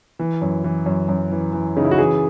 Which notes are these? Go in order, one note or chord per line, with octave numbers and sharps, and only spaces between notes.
E3
F#2
E3
F#2
F#2
E3
E3
C#3 D#4
E4
F#4
E3 G#4